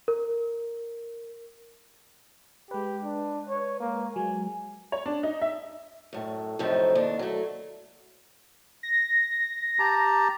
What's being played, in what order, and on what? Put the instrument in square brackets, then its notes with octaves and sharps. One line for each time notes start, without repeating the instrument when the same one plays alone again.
[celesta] A#4
[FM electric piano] G#3 B4 [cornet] G4
[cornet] D4
C#5
A#3
[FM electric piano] F#3 G#3 [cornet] G#5
[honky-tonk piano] C#5
D4
D#4
E5
[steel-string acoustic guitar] F#2 A2
F#2 A2 C3 F3 C4 D#4
D#2 D4
F#3 A3
[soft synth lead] A#6
[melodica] G4 A5 A#5